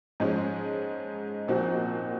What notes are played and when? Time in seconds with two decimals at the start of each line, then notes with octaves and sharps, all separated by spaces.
0.20 G#2 F3 G#3 C#4
1.48 A#2 F3 C4 D#4 F#4